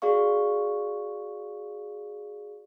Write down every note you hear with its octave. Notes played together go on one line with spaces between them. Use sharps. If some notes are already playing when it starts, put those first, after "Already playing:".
F#4 G#4 D5 F5 C#6